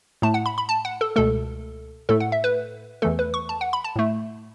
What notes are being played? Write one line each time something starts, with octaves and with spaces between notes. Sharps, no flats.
A2 A3 A5
F#5
B5
B5
A5
F#5
A4
C#2 B2 A3 A4
A2 A3 A4
F#5
E5
B4
E2 E3 A3 A4
B4
C#6
A5
F#5
B5
A5
A2 A3